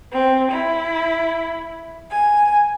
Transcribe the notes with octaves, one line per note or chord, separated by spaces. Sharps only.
C4
E4
G#5